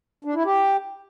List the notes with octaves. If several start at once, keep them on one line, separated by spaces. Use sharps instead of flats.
D4
E4
G4